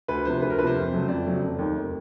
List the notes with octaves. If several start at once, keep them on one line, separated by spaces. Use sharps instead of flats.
D2 B4
C3 F3 C5
D2 B4
A#4
C3 F3 B4 C5
F2
C#3 F#3 A3
F2 D5
C#3 F#3 A3
F1
D#2 D#3
F1